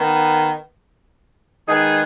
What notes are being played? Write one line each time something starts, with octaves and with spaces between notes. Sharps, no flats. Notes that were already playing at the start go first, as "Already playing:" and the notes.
Already playing: D#3 B3
D#3 G#3 B3 D#4 G#4